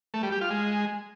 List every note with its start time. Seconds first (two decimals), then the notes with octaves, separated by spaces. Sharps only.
0.14 A3
0.23 G3
0.32 G4
0.41 F4
0.51 G#3